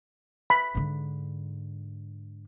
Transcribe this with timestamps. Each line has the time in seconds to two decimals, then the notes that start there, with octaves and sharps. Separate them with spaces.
0.50 B5
0.75 G#2 D3